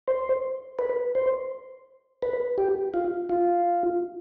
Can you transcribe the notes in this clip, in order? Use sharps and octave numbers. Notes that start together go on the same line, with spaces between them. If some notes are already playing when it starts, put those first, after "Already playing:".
C5
B4
C5
B4
G4
F4
F4